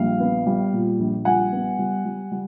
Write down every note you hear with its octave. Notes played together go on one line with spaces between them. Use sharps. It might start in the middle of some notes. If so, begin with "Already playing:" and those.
Already playing: A#1 G3 F5
B3
G3
A#2
A#1
G3 F#5 G#5
B3
G3
G3
G3